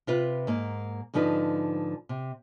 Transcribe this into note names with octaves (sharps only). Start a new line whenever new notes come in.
C3 F4 B4
G#2 A#3
G#2 D3 F3 D#4 B4
C3